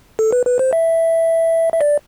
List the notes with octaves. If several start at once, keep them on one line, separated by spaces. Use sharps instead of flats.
A4
B4
B4
C5
E5
E5
D5